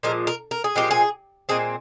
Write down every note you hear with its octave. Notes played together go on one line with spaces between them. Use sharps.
A#2 F3 G#3 A#4
A#4
A#4
G#4
A#2 F3 G#3 C4 G4
G#4
A#2 G#3 C4 G#4